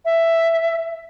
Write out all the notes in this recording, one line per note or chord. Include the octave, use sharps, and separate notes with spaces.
E5